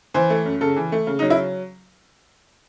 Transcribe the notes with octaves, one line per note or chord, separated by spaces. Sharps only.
E3 C5
A3
F#2
C#3 A4
E3
A3
C#3
D#4
F#3
E4